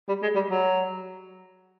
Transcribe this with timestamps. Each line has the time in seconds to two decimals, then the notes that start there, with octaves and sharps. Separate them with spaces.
0.08 G3
0.22 G#3
0.35 G3
0.50 F#3